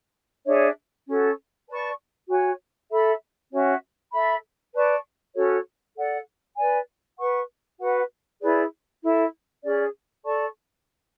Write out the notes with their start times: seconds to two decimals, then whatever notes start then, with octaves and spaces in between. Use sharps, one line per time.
0.46 D4 G#4 C#5 E5
1.07 C#4 F#4 A4
1.68 B4 D5 A5 C#6
2.29 F#4 C#5 G#5
2.90 A4 E5 B5
3.51 C#4 F#4 C#5 E5
4.13 A4 E5 B5
4.73 B4 D5 A5 C#6
5.35 C#4 F#4 A4 C#5
5.96 A4 D5 F#5
6.57 B4 D5 G#5
7.18 B4 F#5 C#6
7.79 F#4 B4 F#5
8.40 E4 G#4 B4 D5
9.02 E4 A4 E5
9.63 C#4 G#4 D5
10.24 A4 D5 A5 C#6